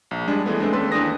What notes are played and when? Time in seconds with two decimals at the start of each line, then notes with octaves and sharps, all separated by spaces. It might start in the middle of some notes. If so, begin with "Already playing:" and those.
0.11 A#1
0.28 G3 G#3 D4 G#4
0.46 E3 G#3 A3 B3
0.60 G#3 A3 C4 D4
0.73 D#2 C#4 A4 B4 C6
0.92 D#2 E3 D4 B4 D#6 A#6